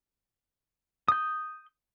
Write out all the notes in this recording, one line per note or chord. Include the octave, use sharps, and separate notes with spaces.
D#6 G6